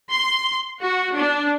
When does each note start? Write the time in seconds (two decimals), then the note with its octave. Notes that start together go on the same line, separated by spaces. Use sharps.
0.11 C6
0.79 F#4
1.15 D4